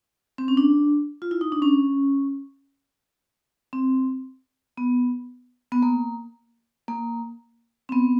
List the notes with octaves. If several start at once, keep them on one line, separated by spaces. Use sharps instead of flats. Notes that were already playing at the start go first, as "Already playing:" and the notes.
C4
C#4
D4
F4
E4
D#4
D4
C#4
C4
B3
B3
A#3
A#3
C4
B3